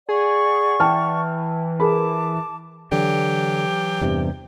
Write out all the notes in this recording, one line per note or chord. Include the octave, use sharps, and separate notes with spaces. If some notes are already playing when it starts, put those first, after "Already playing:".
G#4 D5 F#5 C#6
E3 G5 A5 F6
G#4 A#4 A5 B5 D6
D3 E3 F#3 G4
E2 G2 C3